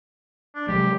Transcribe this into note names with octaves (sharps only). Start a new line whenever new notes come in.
D4
C3 F#3 G#3 G4